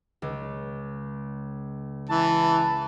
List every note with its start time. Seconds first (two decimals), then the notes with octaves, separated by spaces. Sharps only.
0.22 C#2
2.10 E3 A5